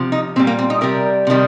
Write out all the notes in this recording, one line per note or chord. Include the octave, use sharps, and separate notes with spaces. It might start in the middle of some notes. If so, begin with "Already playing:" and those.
Already playing: C3 F3
D#4
A#2 G3 C4
A#3
C4
D#4
C3 G3 A#4
C3 D#3 G3